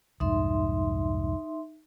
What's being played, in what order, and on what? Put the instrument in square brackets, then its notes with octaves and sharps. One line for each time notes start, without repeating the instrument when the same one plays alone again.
[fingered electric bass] C2 F2 G#2 [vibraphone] D#4 E5 C6